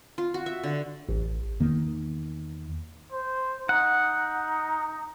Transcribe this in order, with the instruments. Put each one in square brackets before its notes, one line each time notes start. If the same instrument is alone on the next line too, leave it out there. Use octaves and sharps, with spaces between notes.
[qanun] F4
F#4
E5
D3
[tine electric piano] A1
[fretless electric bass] E2 D#3 A#3
[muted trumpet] C5
[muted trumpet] D#4 [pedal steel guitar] F#5